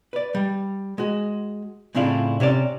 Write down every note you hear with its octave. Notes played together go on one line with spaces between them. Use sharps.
B4 D5
G3
G#3 F#4
A2 C#3 C4 D4 E4 F4
C3 C#4 C5 D5